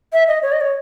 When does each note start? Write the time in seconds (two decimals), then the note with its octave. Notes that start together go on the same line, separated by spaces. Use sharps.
0.13 E5
0.28 D#5
0.42 C#5
0.52 D#5
0.61 C#5